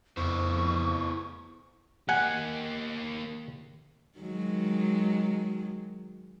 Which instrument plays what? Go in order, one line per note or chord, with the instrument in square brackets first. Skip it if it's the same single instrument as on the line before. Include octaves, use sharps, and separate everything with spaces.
[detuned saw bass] F2 [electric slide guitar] B3 E4 C5 [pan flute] C#6
[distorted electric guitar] A#3 G4 [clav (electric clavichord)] F#5 G#5
[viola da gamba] D#3 F#3 G#3